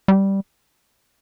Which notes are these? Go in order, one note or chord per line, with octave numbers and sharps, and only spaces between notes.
G3